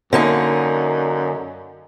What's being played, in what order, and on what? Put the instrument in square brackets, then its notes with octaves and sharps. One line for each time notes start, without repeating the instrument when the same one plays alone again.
[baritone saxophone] F#2 [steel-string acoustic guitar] D3 A#3 D#4